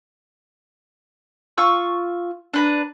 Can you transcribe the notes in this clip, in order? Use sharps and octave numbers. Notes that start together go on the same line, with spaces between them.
F4 C#6 E6
D4 B4 A#5